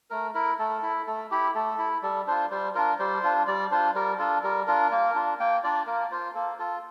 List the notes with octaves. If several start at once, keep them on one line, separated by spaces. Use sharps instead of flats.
A3 A#4
E4 A#4
A3 A4
E4
A3 A4
E4 G4
A3 A4
E4
G3 A4
D4 F4 C5
G3 C5
D4 F4 A#4
G3 C5
D4 F4
G3 D5
D4 F4 C5
G3 A#4
D4 F4 A4
G3 A#4
D4 F4 A#4
A#3
D4 F4
A#3 G5
D4 F4 D5
A#3 A#4
F4 C5
A#3 A4
F4 A4